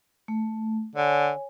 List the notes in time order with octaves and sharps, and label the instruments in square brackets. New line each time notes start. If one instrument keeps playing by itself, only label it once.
[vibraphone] A3
[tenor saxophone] D3 [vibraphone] C#5 G#5